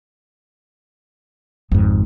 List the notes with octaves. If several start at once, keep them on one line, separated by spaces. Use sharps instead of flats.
G#1 F2 G#2 D#3